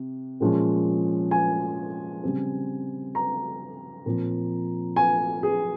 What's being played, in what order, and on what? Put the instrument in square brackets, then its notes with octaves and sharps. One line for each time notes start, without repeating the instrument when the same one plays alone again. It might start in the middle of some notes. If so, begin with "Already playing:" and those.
Already playing: [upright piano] C3
A#2 F3 G#3 C#4
G#5
C#3 G3 C4
A#5
A#2 F3 C4
G#5
G#4